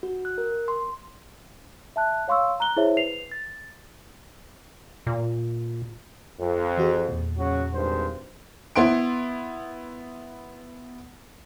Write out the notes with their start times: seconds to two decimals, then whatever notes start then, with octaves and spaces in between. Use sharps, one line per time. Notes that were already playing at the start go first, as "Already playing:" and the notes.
0.03 F#4
0.25 F#6
0.38 A#4
0.68 C6
1.96 E5 A5 F#6
2.28 C#5 F5 C6 C#6 E6
2.60 A#5 F#6 G7
2.77 E4 G#4 C5 C#5 E5
2.97 B4 C7 F7
3.31 A6
5.07 A#2
6.40 F2
6.77 E3 F#4 G#4
7.08 E2 A#2
7.37 C#3 F#3 F#4
7.72 G#1 G2 C5
8.76 B3 E4 C6 D7